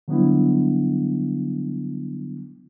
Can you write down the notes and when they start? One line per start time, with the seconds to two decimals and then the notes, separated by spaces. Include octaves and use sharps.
0.08 D3 F#3 G3 B3 D4 E4